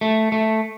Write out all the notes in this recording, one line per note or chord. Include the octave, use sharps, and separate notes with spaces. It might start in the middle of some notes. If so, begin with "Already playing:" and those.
A3
A3